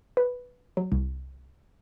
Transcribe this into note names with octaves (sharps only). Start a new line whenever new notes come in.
B4
F#3
C2